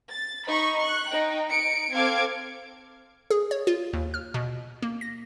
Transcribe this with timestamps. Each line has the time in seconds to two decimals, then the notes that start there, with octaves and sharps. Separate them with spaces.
0.13 A6
0.46 D#4 B5 C#6
0.79 C#6 F#6
1.10 D#4 G5
1.49 D#4 C#7 D7
1.92 C4 A4 F5 D6 G#6 D7
3.30 G#4
3.51 C#5
3.67 F4
3.93 D#2
4.14 F6
4.34 B2
4.82 A#3
5.01 A#6